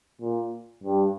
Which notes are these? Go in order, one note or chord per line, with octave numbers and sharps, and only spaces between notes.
A#2
G2